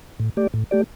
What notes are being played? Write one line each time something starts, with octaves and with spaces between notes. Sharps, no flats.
A2
A3 G4 D5
A2
A3 G4 D5